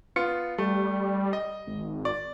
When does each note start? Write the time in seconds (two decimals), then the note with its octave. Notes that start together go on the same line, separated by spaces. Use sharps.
0.16 B3 F4 C#7
0.58 G3 A3
1.33 D#5
1.67 G#1
2.05 D5